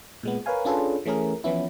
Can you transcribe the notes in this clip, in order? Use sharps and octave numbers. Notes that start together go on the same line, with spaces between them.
A#2 G#3 B3
A#4 B4 C#5 F5 G#5
C#4 D4 F4 G#4 A4 B4
E3 A3 C#4 G#4 A#4
E3 F3 B3 C#4 E4